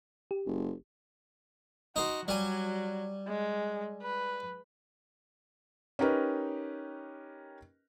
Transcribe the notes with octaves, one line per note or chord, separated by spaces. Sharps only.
G4
F#1
D#4 F#4 C5
F#3 G3 G#5
G#3
B4
C#4 D#4 G4 A#4 B4 D#5